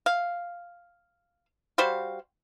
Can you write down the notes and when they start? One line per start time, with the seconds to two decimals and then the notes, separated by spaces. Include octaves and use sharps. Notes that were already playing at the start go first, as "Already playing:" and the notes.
0.06 F5
1.78 G3 F#4 C5 F5